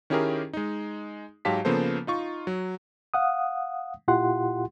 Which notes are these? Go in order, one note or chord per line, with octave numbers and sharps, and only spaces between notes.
D#3 C#4 E4 G4 G#4 A#4
G#3 D#4
G#2 F#3 G4 F5 A5 B6
C#3 F3 A#3 B3 A4 C5
D#4 F4 C#6
F#3
F5 F#5 D#6
A#2 E4 F4 G4 F#5 C6